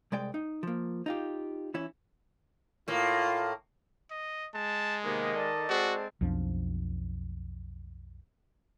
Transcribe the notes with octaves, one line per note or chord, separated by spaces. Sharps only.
C2 G#3 D5 G5
D#4
F3 A#3
D#4 F4 G4
E3 C#4 E4
A2 A#3 F4
D#5
G#3 A5
C3 D#3 A#3 B3 D#5
A4 D5 A5
G#3 C4 F#4
B1 F2 F3 D4